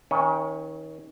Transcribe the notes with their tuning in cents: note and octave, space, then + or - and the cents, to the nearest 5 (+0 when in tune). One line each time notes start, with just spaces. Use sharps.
D#3 +35 C#4 -5